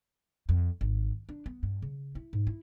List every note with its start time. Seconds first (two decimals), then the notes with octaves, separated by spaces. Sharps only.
0.49 F2
0.81 G#1
1.29 D4
1.46 B3
1.63 G2
1.82 C#3
2.15 E4
2.33 G#2
2.47 E4